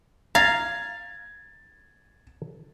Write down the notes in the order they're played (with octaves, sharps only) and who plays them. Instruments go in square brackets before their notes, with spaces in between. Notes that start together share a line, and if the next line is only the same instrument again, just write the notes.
[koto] F5 [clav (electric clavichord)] A#5 [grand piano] G#6 A6